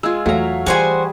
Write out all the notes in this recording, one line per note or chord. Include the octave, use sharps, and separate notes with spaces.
G#3 F4 E6 G#6
E2 F#3 A3 F5 A#5
E3 G3 F#4 G#4 C5 G#5